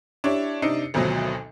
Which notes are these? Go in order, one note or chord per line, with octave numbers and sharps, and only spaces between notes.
D4 E4 G4 C#5
C3 D4 D#4 C7 C#7
G#1 D2 B2 F3 F#3